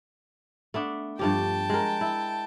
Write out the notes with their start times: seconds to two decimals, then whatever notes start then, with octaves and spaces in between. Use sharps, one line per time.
0.74 A3 B3 D4
1.19 G2 F3 G4 G5 A5
1.70 G#3 A#4
2.01 E4